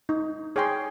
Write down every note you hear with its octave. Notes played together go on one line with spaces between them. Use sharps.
D#4
G#4 C#5 G5 C6